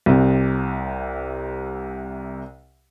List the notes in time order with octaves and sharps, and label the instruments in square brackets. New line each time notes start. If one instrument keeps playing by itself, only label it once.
[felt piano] C2 C3